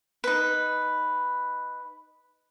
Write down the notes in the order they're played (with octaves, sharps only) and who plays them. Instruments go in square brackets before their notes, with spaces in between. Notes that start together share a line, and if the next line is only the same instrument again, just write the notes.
[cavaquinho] D#4 B4